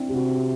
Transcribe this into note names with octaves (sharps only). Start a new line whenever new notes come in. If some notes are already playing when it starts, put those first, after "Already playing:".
Already playing: C4 D4 E4
G4
C3 F#4